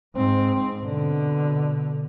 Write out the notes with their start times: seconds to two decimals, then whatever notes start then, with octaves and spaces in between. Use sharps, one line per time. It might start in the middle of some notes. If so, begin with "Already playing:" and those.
0.15 G#2 C4
0.83 B2 D3